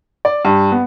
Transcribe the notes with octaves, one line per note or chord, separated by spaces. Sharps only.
D5
G2
B3